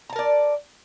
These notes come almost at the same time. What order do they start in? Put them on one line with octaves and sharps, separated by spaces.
A#5 A5 A#4 D5